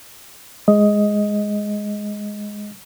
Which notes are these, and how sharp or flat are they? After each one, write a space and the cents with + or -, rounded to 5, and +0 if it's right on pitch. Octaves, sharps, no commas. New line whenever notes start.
G#3 +0 D#5 +10